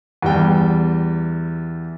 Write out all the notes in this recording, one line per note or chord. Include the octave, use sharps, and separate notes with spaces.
E2 G3 G5